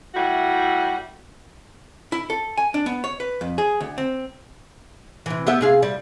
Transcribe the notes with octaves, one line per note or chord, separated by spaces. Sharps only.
G3 A3 E4 F#4
E4
A4
G#5
D4
B3
C#5
B4
F2
G#4
D2
C4
C3 E3
B3 G4 E5
C3 G#4 F5
G3